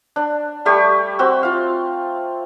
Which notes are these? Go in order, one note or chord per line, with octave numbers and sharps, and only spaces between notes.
D4
G3 A3 G4 C#6
C4 F#4 E6
F4 F5